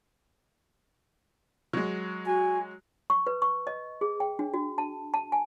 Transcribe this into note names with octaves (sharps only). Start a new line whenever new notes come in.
F#3 G#3
F#4 G#5
C#6
B4
C#6
D#5
G#4
G5
D4
F#4
A5
A5
G#5